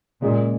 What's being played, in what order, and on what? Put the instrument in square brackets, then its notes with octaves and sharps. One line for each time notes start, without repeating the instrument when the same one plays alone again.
[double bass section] A#2 [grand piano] C#3 G#3 C#4 G#4 D#5